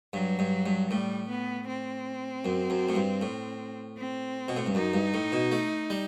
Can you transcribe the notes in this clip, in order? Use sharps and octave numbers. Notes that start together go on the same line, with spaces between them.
G2 F#3
G2
G2
A2 G3
B3
C4
F#2
F#2
A2
G2
A2
C4
B2
A2
G2
F#2 D#4
G2
A2
B2
A3
G3